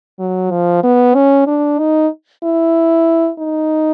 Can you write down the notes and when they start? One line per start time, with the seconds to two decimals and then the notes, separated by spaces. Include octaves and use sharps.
0.19 F#3
0.51 F3
0.83 B3
1.15 C#4
1.47 D4
1.79 D#4
2.44 E4
3.39 D#4